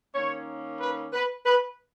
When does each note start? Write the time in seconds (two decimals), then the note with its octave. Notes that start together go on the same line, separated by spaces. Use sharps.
0.15 D#3 A#3 C#4 C#5
0.80 B4
1.13 B4
1.46 B4